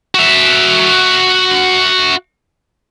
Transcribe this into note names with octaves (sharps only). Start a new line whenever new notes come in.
F#4 E5